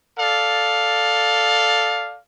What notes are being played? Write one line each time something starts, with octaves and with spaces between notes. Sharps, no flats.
A4 D5 F5